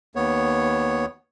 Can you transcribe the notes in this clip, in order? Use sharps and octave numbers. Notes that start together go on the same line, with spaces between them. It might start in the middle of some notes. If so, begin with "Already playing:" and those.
D#2 B3 C#5